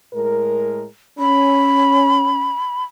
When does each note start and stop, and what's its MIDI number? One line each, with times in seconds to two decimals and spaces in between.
0.13 0.84 45
0.13 0.84 56
0.13 0.84 70
1.19 2.52 61
1.19 2.84 83